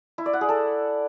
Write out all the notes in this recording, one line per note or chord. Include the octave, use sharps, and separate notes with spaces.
E4
D5
F#5
G#4
A4